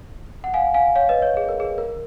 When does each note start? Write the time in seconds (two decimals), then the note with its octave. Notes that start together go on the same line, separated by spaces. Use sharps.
0.44 F#5
0.54 F5 G#5
0.74 F5 G#5
0.95 C#5 F5
1.09 B4 D#5
1.22 C#5
1.37 G#4
1.49 A#4
1.60 G#4
1.78 A#4